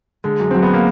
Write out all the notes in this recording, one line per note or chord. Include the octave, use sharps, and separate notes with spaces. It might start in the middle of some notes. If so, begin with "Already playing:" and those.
D3 G#3
F#2
F#3 C4
B3
A#3